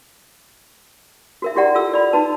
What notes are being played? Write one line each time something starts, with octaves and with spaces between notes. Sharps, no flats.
F#4 A#4 E5
E4 F#4 G4 D5 F#5 A#5
F4 A4 E6
D5 B5
D#4 F#4 B4 A5